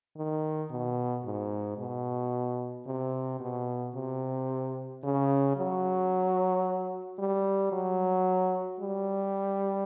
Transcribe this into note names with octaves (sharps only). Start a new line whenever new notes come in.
D#3
B2
G#2
B2
C3
B2
C3
C#3
F#3
G3
F#3
G3